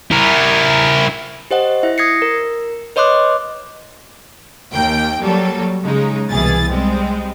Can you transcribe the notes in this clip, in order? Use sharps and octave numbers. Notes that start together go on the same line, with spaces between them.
E4 A#4
G4 C5 D#5 F#5
E4 E5
D#6 G#6 A#6 C7 C#7
A#4
B4 C#5 D#5 C6 D6 F#6
D#2 A#3 G5
F#3 G3 A#3 A4
C#3 G#3 D#4
C2 B2 E3 G#4 A6
G3 G#3 C4